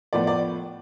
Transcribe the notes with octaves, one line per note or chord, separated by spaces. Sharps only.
A2 F3 B3 D5
D5